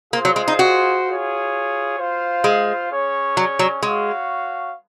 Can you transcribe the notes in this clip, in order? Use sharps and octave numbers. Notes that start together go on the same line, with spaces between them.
A#3 F4 G#4 C5
F#3
G#3
D#4
F#4
F4 G#4 C#5
F4 C5 F5
G#3
C#4 G#4 C#5
F#3
F#3
G#3 F#4 C#5 F5